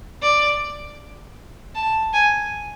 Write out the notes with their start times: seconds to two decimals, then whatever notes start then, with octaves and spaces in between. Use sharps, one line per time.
0.22 D5
1.75 A5
2.13 G#5